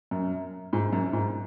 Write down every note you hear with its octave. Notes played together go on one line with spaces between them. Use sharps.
F#2
G#2
F#2
G#2